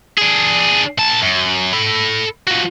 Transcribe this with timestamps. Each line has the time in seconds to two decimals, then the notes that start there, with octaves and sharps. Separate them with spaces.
0.17 D4 G#4
0.98 A#2 A5
1.22 F#2
1.73 A4 B5
2.47 F3 F#4